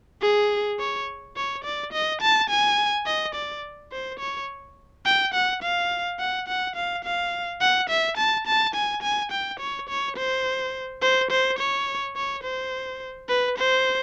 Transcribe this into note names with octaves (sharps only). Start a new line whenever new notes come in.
G#4
C#5
C#5
D5
D#5
A5
G#5
D#5
D5
C5
C#5
G5
F#5
F5
F#5
F#5
F5
F5
F#5
E5
A5
A5
G#5
G#5
G5
C#5
C#5
C5
C5
C5
C#5
C#5
C5
B4
C5